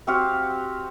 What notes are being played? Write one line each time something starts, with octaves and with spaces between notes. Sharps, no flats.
C4 F#4 G4 F5